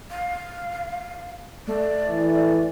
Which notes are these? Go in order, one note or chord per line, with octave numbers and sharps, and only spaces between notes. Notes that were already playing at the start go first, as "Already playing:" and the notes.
F5
A3 D5
E3